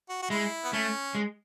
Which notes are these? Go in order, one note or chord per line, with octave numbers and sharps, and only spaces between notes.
F#4
F#4
G#3 E4
B3
A3 C#4
G#3